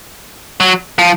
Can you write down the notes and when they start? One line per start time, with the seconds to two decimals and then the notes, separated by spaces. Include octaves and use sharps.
0.60 F#3
0.99 F3